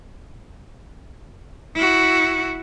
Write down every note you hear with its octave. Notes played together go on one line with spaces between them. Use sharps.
E4 F#4